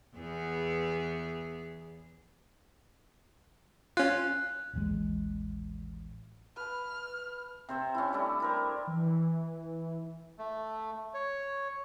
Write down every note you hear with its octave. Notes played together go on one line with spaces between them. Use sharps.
E2 B3 G#4
C#4 F4 F#6
A1 D#2 E3 G#3
B4 A5 F6
C3 C5 E5
C#4 E4
G3 A3 D4 E4
E4 A#4 C5
E3
A3
C#5